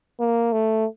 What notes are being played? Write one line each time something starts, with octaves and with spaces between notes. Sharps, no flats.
A#3
A3